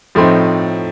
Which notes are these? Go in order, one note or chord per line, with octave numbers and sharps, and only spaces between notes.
A2 F3 A3 C4 D#4